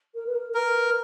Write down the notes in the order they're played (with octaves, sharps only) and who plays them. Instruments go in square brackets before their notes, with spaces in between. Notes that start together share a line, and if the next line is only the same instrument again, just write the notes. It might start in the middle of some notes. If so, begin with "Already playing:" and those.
[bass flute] A#4
B4
A#4
[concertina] A#4 [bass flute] B4